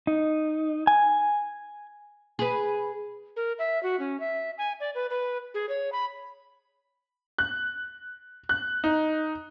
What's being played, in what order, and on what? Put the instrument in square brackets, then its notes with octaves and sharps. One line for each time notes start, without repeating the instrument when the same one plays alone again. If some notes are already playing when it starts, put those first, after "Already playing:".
[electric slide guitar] D#4
G#5
[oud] G#4 B4
[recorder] A#4
E5
F#4
C#4
E5
G#5
D5
B4
B4
G#4
C#5
B5
[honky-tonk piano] F#6
F#6
D#4